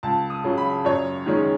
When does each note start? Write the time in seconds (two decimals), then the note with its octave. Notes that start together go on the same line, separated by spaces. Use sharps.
0.03 C#2 A5
0.30 D#6
0.44 C#3 F#3
0.58 B5
0.85 F#2 C#5
1.26 D#3 G#3 C#4